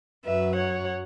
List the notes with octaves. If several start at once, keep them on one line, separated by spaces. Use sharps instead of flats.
F#2 F#3 B4 E5
C#5 F#5